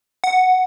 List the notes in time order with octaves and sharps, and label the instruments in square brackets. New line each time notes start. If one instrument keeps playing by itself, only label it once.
[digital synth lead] F#5